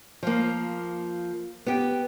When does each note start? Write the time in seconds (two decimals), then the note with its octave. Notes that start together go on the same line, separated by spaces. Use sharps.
0.23 F3 A#3
1.66 B3 G4